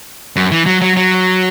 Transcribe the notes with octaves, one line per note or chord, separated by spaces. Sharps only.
F#2
E3
F#3
F#3
F#3